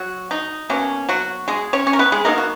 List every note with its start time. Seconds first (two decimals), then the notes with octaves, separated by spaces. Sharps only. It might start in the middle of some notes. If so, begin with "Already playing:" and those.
Already playing: F#3 F#4
0.31 D#4
0.70 B2 F#3 A#3 C#4
1.09 F#3 F#4
1.48 G#3 G#4
1.73 C#4 C#5
1.87 C#4 C#5
1.93 A#4
1.99 B3 B4
2.12 G#3 G#4
2.25 F#3 A#3 B3 D#4 A#4
2.38 F#4